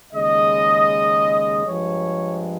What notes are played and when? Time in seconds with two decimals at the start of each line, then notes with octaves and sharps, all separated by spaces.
0.13 D#2 C#3 G#3 D#5
1.65 G2 F3 G#3 C#5